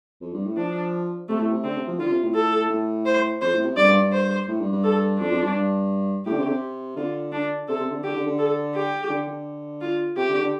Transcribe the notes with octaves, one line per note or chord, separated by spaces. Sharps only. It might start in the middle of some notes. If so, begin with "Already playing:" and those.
F2
G2
A2
F3 D4
C3 A3
A2
C3
D3 C4
C3
F3
D3 F4
C3
A2
A4
A2
C5
F2 C5
A2
C3
G2 D5
G2
G2
C5
A2
G2
G2
A4
F2 D4
F2
G2
G2
A2 G4
D3
C3
D3
C3
D3 F4
D4
C3 A4
C3
D3
D3 G4
D3
D3
A4
G4
D3
D3
F4
C3 G4
D3
D3